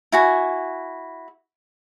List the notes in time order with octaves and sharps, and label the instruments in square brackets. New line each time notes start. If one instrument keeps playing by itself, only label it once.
[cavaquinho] E4 F#4 G#5